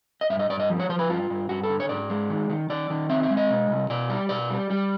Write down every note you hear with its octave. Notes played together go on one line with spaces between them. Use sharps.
D#5
G2 E5
D#5
G2 D5
D#5
F3
C#5
F3 C5
B4
G2 F4
G2
G2 F#4
A4
D3
C#5
G#2 D5
G#3
D#3
D#3
D#3 D5
D#3
C4 E5
E5
G#3
D#5
B2
C2
B2 D5
G3
B2 D5
G3
G3